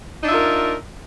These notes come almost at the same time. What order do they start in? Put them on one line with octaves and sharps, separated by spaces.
D#4 D4 E5 F4 A#4